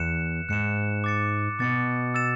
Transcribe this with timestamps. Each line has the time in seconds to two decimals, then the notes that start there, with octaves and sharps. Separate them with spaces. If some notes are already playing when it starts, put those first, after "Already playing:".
Already playing: E2 F#6 C#7 E7
0.49 G#2 F#6 C#7 E7
1.04 D6 A6 C#7
1.59 B2 D6 A6 C#7
2.14 E6 A6 E7